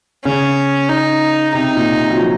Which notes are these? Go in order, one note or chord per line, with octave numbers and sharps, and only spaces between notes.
C#3 C#4
D#4
C3 D#4
A#2
C3
F#3
F3